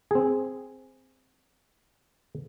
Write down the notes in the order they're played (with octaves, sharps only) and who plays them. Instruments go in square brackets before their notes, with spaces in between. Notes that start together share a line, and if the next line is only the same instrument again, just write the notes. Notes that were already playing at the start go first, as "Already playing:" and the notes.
[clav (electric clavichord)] C4 G#4